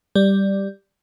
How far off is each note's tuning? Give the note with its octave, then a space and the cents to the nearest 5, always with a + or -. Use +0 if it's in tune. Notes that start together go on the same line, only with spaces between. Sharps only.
G3 +0 D5 +0